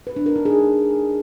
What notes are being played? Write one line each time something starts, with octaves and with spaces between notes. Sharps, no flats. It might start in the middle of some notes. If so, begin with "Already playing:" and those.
B4
D4
A#4
D#4
G#4